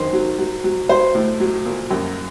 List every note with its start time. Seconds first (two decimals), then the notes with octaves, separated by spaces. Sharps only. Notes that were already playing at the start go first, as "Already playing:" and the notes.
Already playing: F#2 D#3 C5
0.13 F#3
0.38 F#3
0.64 F#3
0.89 F#3 C5
1.15 A2
1.40 F#3
1.66 A#2
1.91 F#2